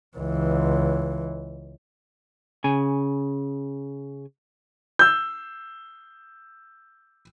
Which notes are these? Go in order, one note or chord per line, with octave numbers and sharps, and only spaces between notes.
C#2 E3
C#3 G#5
E6 G6